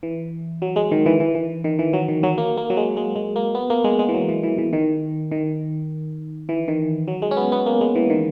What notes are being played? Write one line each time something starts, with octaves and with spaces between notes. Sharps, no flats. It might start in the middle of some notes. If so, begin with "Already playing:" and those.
E3
F#3
G#3
D#3
E3
E3
E3
D#3
E3
F#3
D#3
F#3
A#3
A#3
F#3
G#3
G#3
G#3
A#3
B3
A#3
G#3
G#3
E3
F#3
E3
E3
E3
D#3
D#3
E3
D#3
F#3
G#3
C#4
B3
B3
A#3
G#3
E3
D#3